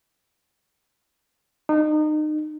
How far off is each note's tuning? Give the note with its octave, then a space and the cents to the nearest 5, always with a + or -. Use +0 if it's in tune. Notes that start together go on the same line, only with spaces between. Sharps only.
D#4 -30